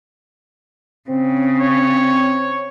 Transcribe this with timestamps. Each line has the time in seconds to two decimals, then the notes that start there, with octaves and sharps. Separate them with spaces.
1.10 C#3 C4
1.59 C#5